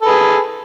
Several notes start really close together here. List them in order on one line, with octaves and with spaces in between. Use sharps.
A4 B4 G#4